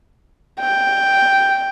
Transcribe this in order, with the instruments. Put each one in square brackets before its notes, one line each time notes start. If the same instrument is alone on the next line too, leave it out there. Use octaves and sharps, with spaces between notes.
[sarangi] G5